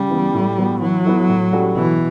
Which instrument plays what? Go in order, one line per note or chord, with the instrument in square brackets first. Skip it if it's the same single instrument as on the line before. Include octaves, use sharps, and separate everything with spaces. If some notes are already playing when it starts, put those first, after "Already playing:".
Already playing: [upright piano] C#3 [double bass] G3
[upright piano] E3 B3
A2
F#3 B3 F#4
[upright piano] E3 [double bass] F#3
[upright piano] B3 E4 A4
A2
G3 C#4 F#4 A4
[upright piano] B2 [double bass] E3